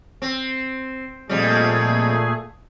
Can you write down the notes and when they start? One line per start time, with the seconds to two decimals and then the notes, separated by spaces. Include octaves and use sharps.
0.22 C4
1.29 F2 A#2 G3 A3 G#4